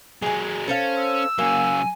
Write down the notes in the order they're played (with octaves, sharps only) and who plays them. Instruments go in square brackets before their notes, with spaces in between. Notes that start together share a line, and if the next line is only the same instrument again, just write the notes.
[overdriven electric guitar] F#3 G#3 [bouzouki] G#4 G#5
[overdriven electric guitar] C#4 [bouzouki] A4 C5 F5
[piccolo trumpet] E6
[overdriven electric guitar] C#3 F#3 [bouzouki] A#3 [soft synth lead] G#5